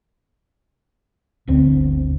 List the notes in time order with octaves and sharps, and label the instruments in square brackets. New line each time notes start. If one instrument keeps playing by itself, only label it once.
[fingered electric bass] G1 D2 D3 C4